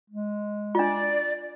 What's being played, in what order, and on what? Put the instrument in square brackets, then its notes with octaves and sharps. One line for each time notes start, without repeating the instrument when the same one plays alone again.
[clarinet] G#3
[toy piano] D4 F4 [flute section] D5